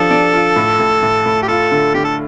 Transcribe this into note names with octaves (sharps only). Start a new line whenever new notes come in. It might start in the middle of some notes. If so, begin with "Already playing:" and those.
Already playing: F3 D4 A4
D4
F4
A2
A2
A2
A2
G4
F4 A4
D3
D3 G4
A4